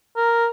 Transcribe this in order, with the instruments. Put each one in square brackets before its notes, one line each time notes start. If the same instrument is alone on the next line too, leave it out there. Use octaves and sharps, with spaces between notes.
[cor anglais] A#4